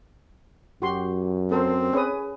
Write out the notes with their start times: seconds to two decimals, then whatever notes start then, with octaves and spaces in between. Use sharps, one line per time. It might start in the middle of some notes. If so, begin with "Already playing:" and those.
0.82 F#2 F#4 G4 C6
1.51 C4 A4 A#4 C5
1.93 C#4 G#4 B4 D#6